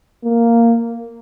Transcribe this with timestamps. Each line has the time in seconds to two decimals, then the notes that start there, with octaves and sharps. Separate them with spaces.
0.24 A#3